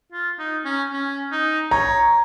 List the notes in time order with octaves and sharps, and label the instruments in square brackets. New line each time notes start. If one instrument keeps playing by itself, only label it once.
[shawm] F4
D#4
C#4
C#4
D#4
[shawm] C#5 [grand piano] A#5